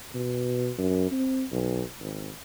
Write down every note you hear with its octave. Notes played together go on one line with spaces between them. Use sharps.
B2
F#2
C4
B1
G#1